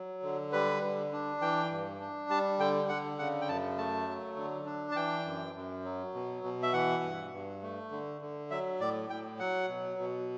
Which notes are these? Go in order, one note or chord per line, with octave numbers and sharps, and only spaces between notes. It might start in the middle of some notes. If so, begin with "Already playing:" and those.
Already playing: F#3
D3
G3 B4
D3
D4
E3 G5
G2
D4
G3 A5
D3 G5
D3 F#5
C#3 F#5
G5
F#2 A5
A3 A5
F#3
D3
D4
A5
E3 G5
F#2
F#2
F#3
B2
B2
E5
E3 F#5
G2
G2
A3
D3
D3
F#3 E5
A2 D5
A2 G5
F#3 F#5
B2
B2